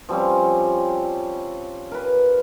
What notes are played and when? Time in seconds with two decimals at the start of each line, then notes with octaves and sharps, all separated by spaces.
0.09 F3 G3 C4 C#4
1.91 A#4 B4